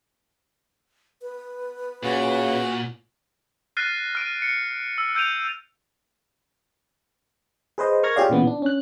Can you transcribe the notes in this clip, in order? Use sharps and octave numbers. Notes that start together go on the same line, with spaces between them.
B4
A#2 C#3 F#4
F6 F#6 A6 A#6 C7 D#7
F6 D7 D#7
C#7
E6
E6 G6 D7 D#7 F7
G#4 B4 C5 D#5
A#4 C#6 F6 G#6 A#6
F4 G4 G#4 C#5 D5 F5
A#2 C#3 E3 B3
D4
C#4 F#6